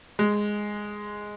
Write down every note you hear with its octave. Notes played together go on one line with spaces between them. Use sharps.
G#3